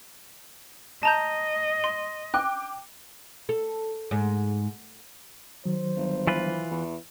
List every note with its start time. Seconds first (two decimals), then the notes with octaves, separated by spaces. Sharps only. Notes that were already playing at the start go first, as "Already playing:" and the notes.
1.03 D#5 A5 A#5 G6
1.84 C6
2.34 G5 D6 F#6
3.49 A4
4.11 G#2
5.65 D#3 F#3 C5
5.96 G1
6.27 E3 F4 B4
6.71 E2